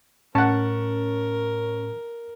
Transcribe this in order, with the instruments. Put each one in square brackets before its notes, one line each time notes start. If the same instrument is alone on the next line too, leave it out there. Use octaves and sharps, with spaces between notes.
[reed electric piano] A2 [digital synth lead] C#4 [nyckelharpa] A#4 [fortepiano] F#5 A5